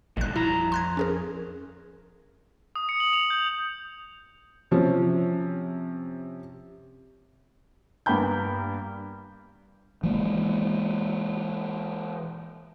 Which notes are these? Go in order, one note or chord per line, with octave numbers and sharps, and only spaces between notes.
A1 A#2 D3 G3 F#6
F2 E4 A#5
C6 F#6 G#6
C#4 G#4 A#4
D#6
C#7
F#7
F7
G6
C3 F3 C#4
G2 A#3 B3 G5 B5 G6
E3 G#3 A#3